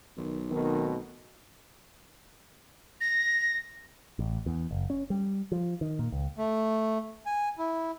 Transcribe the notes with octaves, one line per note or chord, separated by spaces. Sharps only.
B1 D#3
B2 D#3 A3 C4
A#6
A1
E2
F#1
C#4
G3
F3
D#3
A#2
C#2
A3
G#5
E4